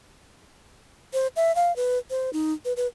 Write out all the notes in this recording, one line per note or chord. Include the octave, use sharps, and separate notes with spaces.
C5
E5
F5
B4
C5
D#4
B4
B4